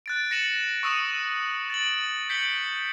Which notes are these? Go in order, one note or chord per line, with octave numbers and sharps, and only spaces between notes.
F#6 A6 D7
A6 A#6 C#7 D#7 E7 F#7
C#6 D#6 E6 C#7 D#7 E7
A6 D7 F#7
G6 B6 C#7 D7 F#7 G7